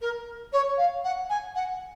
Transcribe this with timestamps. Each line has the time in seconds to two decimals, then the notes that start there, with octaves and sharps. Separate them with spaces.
0.01 A#4
0.53 C#5
0.77 F5
1.04 F#5
1.30 G#5
1.55 F#5